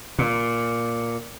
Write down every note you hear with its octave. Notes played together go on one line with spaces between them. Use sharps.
A#2